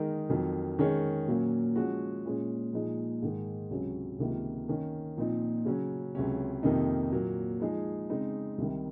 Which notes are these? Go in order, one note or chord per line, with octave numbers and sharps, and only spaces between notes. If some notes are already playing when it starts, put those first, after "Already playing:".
Already playing: D#3 G#3 D#4 A#4
F2 D#3 F#3
D#3 G#3 C#4 G#4 C#5
A#2 F#3 A#3 C#4 F4
F3 G#3 C#4 F#4
A#2 G#3 C#4 F4
A#2 F3 G#3 D#4
G#2 D#3 G#3
C#2 C3 F#3 C#4
C#2 C3 D#3 A#3 F4
D#3 A#3 C#4
A#2 F3 C4 D#4
C#3 F#3 C#4
C#2 C3 F#3 C#4
F2 C3 D#3 A#3 D#4
A#2 F#3 A#3
F3 G#3 D#4 G#4
C#3 G#3 C4 D#4
C2 C3 D#3